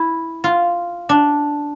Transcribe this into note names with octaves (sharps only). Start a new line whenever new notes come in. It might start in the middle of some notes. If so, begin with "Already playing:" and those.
Already playing: E4
F4
D4